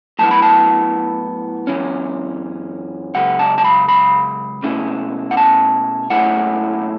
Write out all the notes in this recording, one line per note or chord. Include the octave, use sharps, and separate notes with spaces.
A2 F#3 B3 E4 A5
B5
A5
F#2 E3 C#4
C#2 C#3 F#3 F#5
A5
A5
B5
B5
B2 A3 C#4 E4
F#5
A5
B1 A2 A3 C#4 E4 F#5